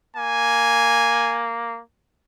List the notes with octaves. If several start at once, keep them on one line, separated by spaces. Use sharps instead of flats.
A#3 G#5